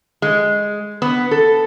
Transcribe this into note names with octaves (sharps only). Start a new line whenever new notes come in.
G#3
B3
A4